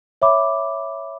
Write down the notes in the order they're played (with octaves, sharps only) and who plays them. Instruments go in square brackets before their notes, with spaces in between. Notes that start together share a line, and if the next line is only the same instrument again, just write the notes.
[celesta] C#5 E5 B5 D6